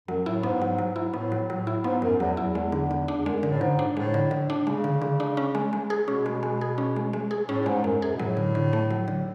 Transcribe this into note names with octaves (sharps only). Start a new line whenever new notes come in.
F#2 F#3
A2 E4
G#2 B3
F#3
F#3
E4
A2 B3
F#3
A2 F#3
E4
G#2 B3
F#2 F#3
E2 F#3
E2 E4
E2 G#3
D3
D3
D4
E2
F#2 G#3
D3
A2
G#2 D3
D4
A2 G#3
D3
D3
D4
C#3 G#3
D3
D3
D4
C#4
G#3
G#3
G#4
B2 C#4
G#3
G#3
G#4
C#4
G#3
G#3
G#4
A2 C#4
A2
G#2 G#3
F#2 G#3
F#2 G#4
B2
A2 F#3
D3
D3
A3
F#3
D3